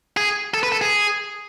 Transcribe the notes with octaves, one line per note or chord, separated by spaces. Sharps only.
G#4
A4
B4
A4
G#4